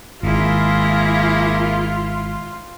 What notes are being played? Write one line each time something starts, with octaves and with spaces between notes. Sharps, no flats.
G#1 A#3 E4 F4 G#4 E5